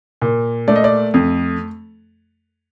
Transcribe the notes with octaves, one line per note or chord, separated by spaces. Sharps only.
A#2
A3 D5
D#5
D5
F2